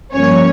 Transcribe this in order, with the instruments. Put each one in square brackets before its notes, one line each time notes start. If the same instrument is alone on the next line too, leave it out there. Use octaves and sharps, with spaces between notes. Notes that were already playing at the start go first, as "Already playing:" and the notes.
[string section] G2 F3 A#3 C#4 C#5